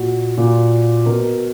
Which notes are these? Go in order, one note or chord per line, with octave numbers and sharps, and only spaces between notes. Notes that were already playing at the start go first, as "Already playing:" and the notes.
Already playing: A#2 F#4
A#2
B2 A#4